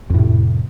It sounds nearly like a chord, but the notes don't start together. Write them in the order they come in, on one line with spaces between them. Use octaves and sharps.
F2 A2 C3